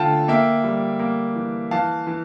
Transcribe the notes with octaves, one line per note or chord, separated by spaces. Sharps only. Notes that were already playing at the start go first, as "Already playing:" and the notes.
Already playing: D3 A3 F4 F5 G5 A5
A#3 E5 G5
G3
A#3
E3
E3 F5 A5
E3